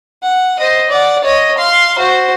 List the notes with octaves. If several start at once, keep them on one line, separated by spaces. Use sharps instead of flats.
F#5
C5 D#5
D5 F#5
C#5 D#5
F5 C6
F#4 C5